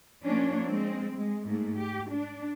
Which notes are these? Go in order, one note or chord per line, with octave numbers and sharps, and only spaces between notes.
F3 A#3 C#4 D4 C#5
G#3 C4
G#3
G#2 A3 A#3
G4
D4